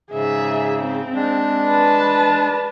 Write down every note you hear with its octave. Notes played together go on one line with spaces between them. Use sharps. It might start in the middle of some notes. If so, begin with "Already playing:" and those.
G#2 C#3 G#4 E5
C4
G#3 D4
B4 A5